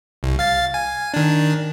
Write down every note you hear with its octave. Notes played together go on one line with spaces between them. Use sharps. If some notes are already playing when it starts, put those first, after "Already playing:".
C2
F5 A6
G#5
D#3 D4